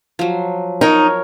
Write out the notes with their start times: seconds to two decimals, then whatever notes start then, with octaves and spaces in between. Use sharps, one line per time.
0.19 F3 F#3
0.81 D#4 A#4 C#5